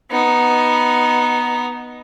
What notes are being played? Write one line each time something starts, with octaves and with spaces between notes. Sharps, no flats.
B3 D#4